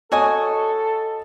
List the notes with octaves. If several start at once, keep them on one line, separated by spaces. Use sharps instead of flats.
F#4 A4 C#5 D#5 G#5 C#6 D#6